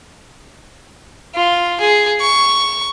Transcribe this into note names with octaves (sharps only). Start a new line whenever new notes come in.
F4
G#4
C#6